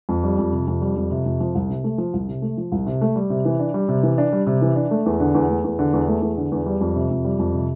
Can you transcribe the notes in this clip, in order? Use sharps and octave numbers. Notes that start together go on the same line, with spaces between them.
F2
G3
F2
C3
F2
G3
F2
C3
F2
F3
C2
C3
A3
F3
C2
C3
A3
F3
C2
C3
A3
G3
C3
E3
D4
G3
C3
E3
D4
G3
C3
E3
D4
A3
E2
D3
E2
A3
E2
D3
E2
A3
E2
D3
E2
G3
F2
C3
F2
G3
F2
C3